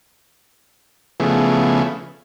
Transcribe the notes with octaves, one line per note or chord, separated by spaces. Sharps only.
C#3 F3 A3 B3 E4 G#4